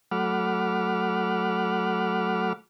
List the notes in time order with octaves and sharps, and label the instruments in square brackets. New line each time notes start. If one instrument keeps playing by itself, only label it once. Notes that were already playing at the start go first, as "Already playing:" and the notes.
[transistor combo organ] F#3 A3 F#5 B5 D6 F6